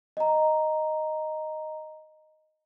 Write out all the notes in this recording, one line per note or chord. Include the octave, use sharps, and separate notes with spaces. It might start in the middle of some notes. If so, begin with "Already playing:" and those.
D#5 A#5